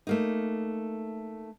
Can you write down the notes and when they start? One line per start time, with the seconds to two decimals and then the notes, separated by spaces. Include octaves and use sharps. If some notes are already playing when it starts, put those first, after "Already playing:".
0.07 A3 A#3 D#4